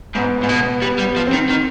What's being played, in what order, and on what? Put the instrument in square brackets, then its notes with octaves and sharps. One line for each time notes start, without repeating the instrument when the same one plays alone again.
[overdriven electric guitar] G#2 [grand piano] B3
[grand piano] B3
[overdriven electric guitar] G#2
B2
[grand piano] B3
[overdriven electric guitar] G3 [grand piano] B3
[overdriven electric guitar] G3
[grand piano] B3
[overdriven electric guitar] F3
[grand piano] C4
[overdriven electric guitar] D#3
D#3